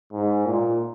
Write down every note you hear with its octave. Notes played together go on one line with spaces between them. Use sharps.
G#2
A#2